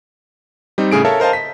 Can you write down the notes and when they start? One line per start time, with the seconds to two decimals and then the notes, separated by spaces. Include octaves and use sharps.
0.78 G3 C4 D#4
0.92 A2 C#3 G#4 D7
1.05 A4 A#4 C#5 E5 F5 A5
1.20 A#4 C5 D#5 F5 A5
1.33 B6